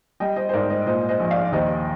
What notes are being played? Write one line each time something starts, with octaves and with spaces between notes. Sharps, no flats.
G3 D#5 G5
C5 D#5
C5
G#2 A#4 D5
C5 D#5
A#2 C5 D#5
C5 D#5
A#1
D5 F5
D5
D#2 C5 D#5